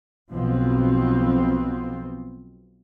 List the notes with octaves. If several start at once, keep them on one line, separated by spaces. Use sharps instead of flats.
B1 B2 F3 B3 C4